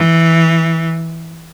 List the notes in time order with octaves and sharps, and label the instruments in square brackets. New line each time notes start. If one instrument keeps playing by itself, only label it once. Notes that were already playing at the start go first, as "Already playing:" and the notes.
Already playing: [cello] E3